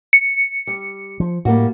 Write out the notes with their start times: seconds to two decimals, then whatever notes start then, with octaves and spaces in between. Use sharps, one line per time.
0.13 C#7
0.67 G3
1.20 F3
1.45 A2 G3 A#3 F#4